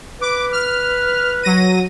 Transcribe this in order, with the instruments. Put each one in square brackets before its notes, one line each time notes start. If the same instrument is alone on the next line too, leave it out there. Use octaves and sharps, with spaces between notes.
[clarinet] B4 [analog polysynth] D6
[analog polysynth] F6
F#3 A#6 D#7